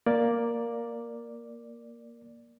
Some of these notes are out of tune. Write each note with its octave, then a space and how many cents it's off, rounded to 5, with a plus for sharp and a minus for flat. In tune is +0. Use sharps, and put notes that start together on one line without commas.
A#3 +0 D5 +0